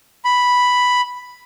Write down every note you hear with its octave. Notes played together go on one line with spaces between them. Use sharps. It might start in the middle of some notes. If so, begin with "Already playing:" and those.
B5